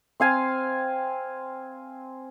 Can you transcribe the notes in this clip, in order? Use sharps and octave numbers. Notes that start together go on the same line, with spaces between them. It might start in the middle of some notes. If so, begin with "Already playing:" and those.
C4 F5 G#5